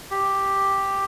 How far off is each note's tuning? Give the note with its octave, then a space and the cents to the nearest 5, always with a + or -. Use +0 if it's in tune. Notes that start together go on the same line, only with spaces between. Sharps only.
G4 +0